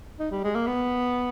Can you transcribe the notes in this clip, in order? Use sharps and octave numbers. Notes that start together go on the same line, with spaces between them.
D#4
G3
G#3
A#3
B3